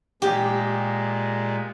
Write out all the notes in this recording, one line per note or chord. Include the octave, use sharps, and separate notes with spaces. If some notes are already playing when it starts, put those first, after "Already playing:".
A#2 G#3 G4